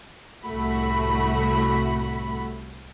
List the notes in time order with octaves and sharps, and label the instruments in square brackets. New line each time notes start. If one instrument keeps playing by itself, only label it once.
[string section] C2 A2 A3 F#4 B5